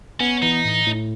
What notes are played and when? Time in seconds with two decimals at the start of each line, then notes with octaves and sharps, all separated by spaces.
0.20 B3 C#4
0.42 E3 D#4
0.65 A2
0.87 A2